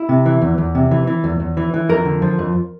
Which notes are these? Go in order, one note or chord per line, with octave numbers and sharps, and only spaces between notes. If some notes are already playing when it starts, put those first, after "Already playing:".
Already playing: E4
C3
E3
E2
E2
C3
E3
E3
E2
E2
E3
E3
F2 A#4
D3
F3
F2